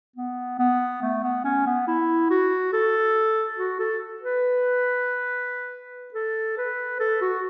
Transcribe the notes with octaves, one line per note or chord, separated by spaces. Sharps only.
B3
B3
A3
B3
C#4
B3
E4
F#4
A4
F#4
A4
B4
A4
B4
A4
F#4